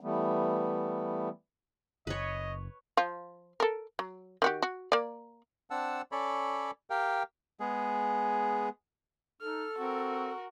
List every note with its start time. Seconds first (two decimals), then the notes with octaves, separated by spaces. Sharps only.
0.01 E3 G3 A3 B3
2.07 F#1 B4 C#5 D#5
2.97 F3 F4
3.60 A4 A#4
3.99 F#3
4.42 D#3 F#4 G4
4.62 F#4
4.92 A#3 D5
5.70 C4 D4 F#5 A5 E6
6.12 C#4 A4 C#5 D5 B5
6.90 G4 A#4 F5 G5
7.60 G#3 B3 G#4
9.41 D#4 A4 F6
9.78 C4 F#4 A#4